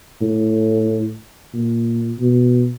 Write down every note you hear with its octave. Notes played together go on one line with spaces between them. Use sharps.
A2
A#2
B2